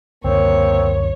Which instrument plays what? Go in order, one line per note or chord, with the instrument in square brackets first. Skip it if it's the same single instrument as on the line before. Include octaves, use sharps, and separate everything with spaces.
[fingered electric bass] C#2 F#2 D3 [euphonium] A#3 [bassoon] C4 [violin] C#5